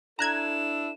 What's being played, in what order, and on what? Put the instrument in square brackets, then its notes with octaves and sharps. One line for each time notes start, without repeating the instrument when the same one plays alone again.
[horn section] D4 E4 A4 [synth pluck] A#5 F#6 G#6 [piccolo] E7